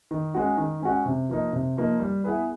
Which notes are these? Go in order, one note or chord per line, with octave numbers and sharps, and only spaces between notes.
D#3
G#3 C#4 F#4
D#3
G#3 C#4 F#4
C3
F3 A#3 D#4
C3
F3 A#3 D#4
G3
B3 E4 G#4 B4